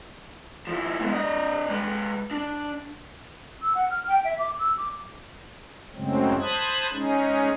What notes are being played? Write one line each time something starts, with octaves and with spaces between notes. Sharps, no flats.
F3 E4
G#3 B3
D4 D#5
G#3 B4
D4
E6
F#5
F6
G5
E5
D6
E6
D6
F#2 A2 C#3 F#3 G#3 C4
C5 A5 B5 D#6 F#6 G#6
G#3 C#4 D#4 G#4